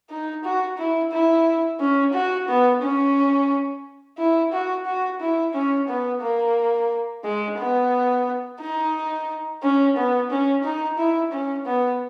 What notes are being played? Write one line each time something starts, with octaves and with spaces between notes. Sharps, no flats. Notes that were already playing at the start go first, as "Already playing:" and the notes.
D#4
F#4
E4
E4
C#4
F#4
B3
C#4
E4
F#4
F#4
E4
C#4
B3
A#3
G#3
B3
D#4
C#4
B3
C#4
D#4
E4
C#4
B3